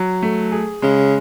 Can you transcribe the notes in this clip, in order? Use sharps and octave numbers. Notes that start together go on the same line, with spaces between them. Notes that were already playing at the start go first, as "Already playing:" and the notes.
Already playing: F#3
A3
G#4
C#3 G#3